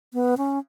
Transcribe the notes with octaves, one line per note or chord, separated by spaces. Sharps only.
B3
C#4